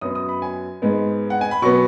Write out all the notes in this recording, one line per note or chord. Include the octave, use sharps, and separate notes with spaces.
F#2 F#3 B3 D#6
D#6
B5
G#5
G#2 G#3 B3
F#5
G#5
B5
B2 F#3 B3 C#6